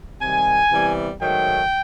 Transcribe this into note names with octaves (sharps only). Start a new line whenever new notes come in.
C3 D#3 G3 G#5
C3 E3 G3 B3
G#2 D#3 F#3 A3 G5